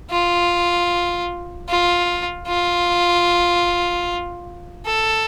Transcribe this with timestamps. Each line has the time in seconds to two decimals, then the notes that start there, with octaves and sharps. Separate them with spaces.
0.10 F4
1.69 F4
2.48 F4
4.86 A4